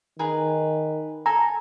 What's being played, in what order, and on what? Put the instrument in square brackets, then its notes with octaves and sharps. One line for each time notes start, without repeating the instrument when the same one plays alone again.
[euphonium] D#3 [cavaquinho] G#4 A#4 B4
[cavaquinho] A4 G#5 [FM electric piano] A#5